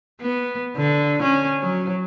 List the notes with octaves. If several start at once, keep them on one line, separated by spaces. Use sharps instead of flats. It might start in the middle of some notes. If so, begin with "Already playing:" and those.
B3
D3
C#4
F#3